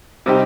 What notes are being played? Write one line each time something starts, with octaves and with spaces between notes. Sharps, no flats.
C3 G3 C4 D#4 G4